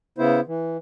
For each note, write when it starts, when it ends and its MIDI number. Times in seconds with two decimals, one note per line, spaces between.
0.18 0.40 49
0.18 0.40 59
0.18 0.40 64
0.18 0.40 72
0.47 0.77 52